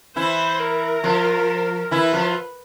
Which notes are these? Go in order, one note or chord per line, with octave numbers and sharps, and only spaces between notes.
E3 E4 C5
A#4
F3 F4
E3 E4 B4
F3 F4